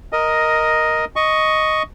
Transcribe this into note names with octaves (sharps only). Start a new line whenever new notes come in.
A#4 D#5
D#5 C#6